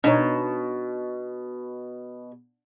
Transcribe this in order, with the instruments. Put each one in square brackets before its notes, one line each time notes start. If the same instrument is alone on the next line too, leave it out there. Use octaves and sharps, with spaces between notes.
[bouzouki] B2 [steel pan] D4 D#4 C#5